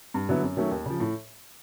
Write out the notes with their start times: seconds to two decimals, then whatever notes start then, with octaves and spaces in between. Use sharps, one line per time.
0.14 G2
0.29 D3 F#3 B3 E4
0.43 F#2
0.57 D#3 F#3 A3 C#4
0.71 D#2
0.85 C#3 F3
1.00 A2